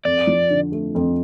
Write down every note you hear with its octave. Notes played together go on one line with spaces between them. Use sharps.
F2 D5
F3
D3
A3
F2